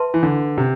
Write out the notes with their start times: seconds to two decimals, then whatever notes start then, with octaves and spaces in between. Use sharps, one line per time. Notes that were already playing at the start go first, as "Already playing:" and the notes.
Already playing: B4 E5 A5 C6
0.14 E3
0.23 D3
0.58 C3